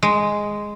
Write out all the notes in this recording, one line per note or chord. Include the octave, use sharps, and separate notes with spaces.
G#3